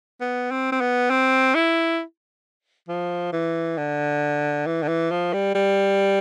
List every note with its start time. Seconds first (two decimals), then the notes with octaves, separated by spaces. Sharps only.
0.21 B3
0.51 C4
0.72 C4
0.81 B3
1.10 C4
1.55 E4
2.88 F3
3.33 E3
3.78 D3
4.66 E3
4.83 D3
4.88 E3
5.11 F3
5.33 G3
5.55 G3